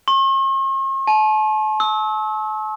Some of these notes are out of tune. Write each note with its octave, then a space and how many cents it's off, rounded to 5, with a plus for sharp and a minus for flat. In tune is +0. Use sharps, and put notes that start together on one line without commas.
C#6 -45
A5 -40
E6 -35